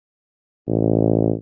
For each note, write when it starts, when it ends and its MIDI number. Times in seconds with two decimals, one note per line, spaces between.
0.68 1.32 33